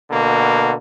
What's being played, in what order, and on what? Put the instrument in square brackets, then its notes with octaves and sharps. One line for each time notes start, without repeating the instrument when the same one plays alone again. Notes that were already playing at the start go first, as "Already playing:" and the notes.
[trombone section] B2 D3 A#3